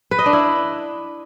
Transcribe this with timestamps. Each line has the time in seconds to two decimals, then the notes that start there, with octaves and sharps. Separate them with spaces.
0.11 B4
0.19 D#5
0.26 D4
0.33 E4